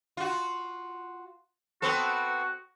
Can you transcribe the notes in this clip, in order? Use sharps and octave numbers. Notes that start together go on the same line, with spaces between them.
F4 F#4
B3 C4 F#4 A4